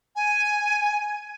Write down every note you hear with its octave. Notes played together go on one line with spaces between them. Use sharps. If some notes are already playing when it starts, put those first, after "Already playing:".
G#5